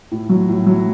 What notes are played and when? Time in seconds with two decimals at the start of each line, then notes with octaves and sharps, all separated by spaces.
0.11 A2
0.29 F#3
0.49 A2
0.66 F#3